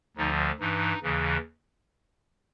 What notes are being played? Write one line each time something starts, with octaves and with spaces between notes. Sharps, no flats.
D2 D3 F3 D#4
G2 E3 D#4
D#2 C#3 E3